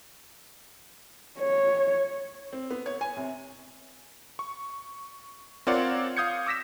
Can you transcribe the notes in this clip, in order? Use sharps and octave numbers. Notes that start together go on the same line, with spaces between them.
C#5
C4
B3
C#5
G#5
C3
C#6
C4 F4 A#4 C#5 D5 F#5
F5 D#6 G6 G#6 C#7
D6 E6 A#6 B6 E7